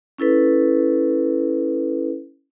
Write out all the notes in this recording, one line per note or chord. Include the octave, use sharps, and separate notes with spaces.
C#4 E4 A4 B4